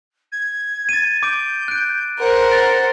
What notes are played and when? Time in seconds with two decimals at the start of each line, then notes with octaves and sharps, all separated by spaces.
0.32 G#6
0.89 A6 D#7
1.23 D6 G6 D7
1.68 F#6 D7
2.19 A#4 C5 F#5
2.52 A6